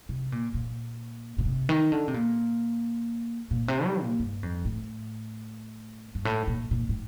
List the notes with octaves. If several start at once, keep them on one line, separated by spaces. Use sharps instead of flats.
C3
A#2
A#2
A#2
C3
D#3
D3
C3
A#2
A#2
C3
G3
A#2
G2
F2
A2
G2
A2
A#2
A#2
A2